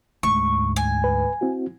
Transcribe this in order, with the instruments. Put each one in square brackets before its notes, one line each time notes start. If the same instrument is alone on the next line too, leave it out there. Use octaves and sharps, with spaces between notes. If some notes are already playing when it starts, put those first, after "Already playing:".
[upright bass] D2 G#2 [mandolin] C#6
[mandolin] G#5
[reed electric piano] B4
C4 E4 F#4